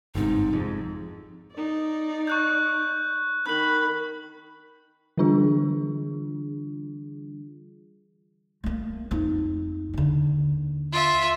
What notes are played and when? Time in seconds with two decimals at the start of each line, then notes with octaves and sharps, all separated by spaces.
0.15 G1 G#2 C3 D#4
0.53 F2 G#2
1.53 D#4 D5
2.27 C#6 F#6 G6
3.46 D#3 B5 F#6 F#7
5.17 D3 E3 G3 D4 F4 G#4
8.64 A3 A#3
9.11 F2 D#4
9.94 D#2 D3
10.92 F4 E5